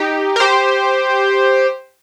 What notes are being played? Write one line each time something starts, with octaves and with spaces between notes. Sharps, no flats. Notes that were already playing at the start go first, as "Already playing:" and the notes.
Already playing: D#4 G4
A#4
G4 C5